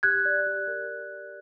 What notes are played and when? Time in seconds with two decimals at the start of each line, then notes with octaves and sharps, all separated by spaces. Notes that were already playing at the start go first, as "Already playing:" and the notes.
0.03 G4 F#6 G#6
0.25 D5
0.47 G4
0.67 A#4